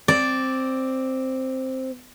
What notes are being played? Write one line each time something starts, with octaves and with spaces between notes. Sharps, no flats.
C4 D5